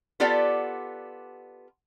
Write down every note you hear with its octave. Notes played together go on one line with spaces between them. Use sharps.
B3 F4 G4 A4 D5 F#5